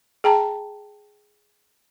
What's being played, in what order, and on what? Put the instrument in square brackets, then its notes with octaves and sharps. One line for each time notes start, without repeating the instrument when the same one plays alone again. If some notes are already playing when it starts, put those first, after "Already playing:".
[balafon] G#4 G5 A5 A#5